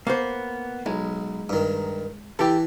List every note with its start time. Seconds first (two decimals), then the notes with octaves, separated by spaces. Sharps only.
0.07 A#3 B3 C5
0.86 B1 G#3
1.49 G2 D#3
2.39 E3 G4 A4